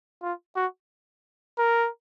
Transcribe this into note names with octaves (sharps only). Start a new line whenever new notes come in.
F4
F#4
A#4